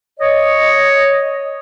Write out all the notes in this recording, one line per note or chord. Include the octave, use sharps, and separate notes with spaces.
C#5 D#5